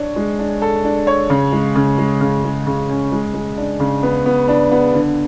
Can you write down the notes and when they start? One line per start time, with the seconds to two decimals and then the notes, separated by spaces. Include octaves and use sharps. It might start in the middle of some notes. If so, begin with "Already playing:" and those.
Already playing: D4 C#5
0.16 G#3
0.39 D4
0.62 A4
0.84 D4
1.07 C#5
1.30 C#3
1.52 G#3
1.75 C#3
1.98 G#3
2.21 C#3
2.44 G#3
2.67 C#3
2.89 C#4
3.12 G#3
3.34 G#3
3.57 D4
3.80 C#3
4.03 B3
4.26 B3
4.48 D4
4.72 B3
4.94 D3